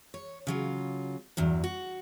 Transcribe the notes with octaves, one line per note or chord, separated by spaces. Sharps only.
C#5
C#3 F#3 F4
E2 G2 F#3
F#4